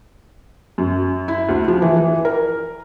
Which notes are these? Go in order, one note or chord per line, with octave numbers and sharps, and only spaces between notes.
F#2
E4
D2
F3
E3
E3
A#4